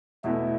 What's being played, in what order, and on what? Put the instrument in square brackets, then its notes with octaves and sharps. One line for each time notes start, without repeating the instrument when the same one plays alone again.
[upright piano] E2 B2 A3 [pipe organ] E4